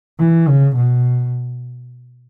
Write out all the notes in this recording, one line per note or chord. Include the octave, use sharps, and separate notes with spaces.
E3
C#3
B2